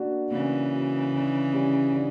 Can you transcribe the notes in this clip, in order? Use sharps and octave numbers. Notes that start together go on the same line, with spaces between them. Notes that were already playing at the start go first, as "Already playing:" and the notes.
Already playing: A#3 D4 F#4
C#3 E3 A#3
D4 F#4
D3
G3 C#4
D3